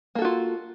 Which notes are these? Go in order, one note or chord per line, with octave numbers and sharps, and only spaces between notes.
A#3 F4 F#4 A4